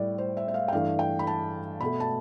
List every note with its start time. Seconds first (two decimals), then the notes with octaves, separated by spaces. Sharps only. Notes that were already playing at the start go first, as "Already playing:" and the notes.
Already playing: A2 G3 D5
0.18 C5
0.37 E5
0.48 E5
0.54 F5
0.68 G5
0.72 G2 E3 A3 F5
0.99 G5
1.19 B5
1.27 A5
1.81 B2 A3 B5
2.00 A5